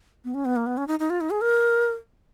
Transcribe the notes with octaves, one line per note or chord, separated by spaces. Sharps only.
B3
C#4
B3
A#3
B3
C#4
D#4
D#4
F4
D#4
G#4
A#4